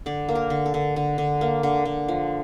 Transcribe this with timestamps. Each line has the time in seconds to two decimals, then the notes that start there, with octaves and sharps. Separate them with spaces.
0.06 D3 D5
0.29 A#3
0.35 A#4
0.50 D3
0.66 A4
0.74 D3
0.96 D3
1.18 D3
1.41 A#3
1.63 D3
1.85 D3
2.08 F3